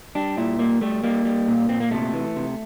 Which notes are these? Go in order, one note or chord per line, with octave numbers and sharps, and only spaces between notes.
G3 D4
A#2 E4
G3 A#3
G3 A3
G3 A#3
G3
A#2
A#2 C4
A#3
C3 A3
E3
C3